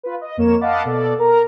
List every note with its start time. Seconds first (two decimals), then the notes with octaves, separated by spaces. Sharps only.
0.03 F4 B4
0.21 D#5
0.37 F2 A#3 A#4 C#5 E7
0.61 D#5 F5 F#5 A5 B5 D6
0.85 B2 A4 D5
1.19 A#4 A#5